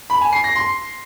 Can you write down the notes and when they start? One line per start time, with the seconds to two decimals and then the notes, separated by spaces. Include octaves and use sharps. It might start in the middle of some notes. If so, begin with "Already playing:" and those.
0.10 B5
0.21 G#5
0.33 C7
0.44 A#6
0.55 C6